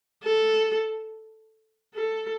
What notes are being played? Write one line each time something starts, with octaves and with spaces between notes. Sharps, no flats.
A4
A4